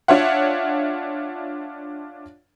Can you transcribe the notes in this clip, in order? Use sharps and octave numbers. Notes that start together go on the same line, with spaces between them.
D4 F4 C#5 E5 F#5